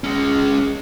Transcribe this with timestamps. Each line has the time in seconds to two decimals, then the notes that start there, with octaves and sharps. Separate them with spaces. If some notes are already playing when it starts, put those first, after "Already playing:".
0.04 G#3 C#4